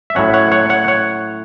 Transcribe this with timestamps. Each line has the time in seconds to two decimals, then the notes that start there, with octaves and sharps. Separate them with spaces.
0.10 E5
0.15 A2 F#3 C#4 C#5 F#5
0.34 C#5 F#5
0.52 C#5 F#5
0.69 C#5 F#5
0.88 C#5 F#5